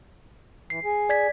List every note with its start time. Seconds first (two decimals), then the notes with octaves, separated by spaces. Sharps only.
0.70 E3 C7
0.84 G#4
1.09 D5 G#6 B6